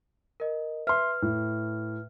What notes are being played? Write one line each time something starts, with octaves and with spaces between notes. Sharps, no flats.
A#4 D#5
B4 E5 C6 F6
A2